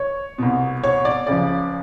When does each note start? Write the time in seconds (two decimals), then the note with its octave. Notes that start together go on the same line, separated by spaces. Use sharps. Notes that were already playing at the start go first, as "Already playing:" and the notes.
Already playing: C#5
0.38 C2 B2
0.84 C#5
1.05 D5
1.27 C#2 C#3 F3 D5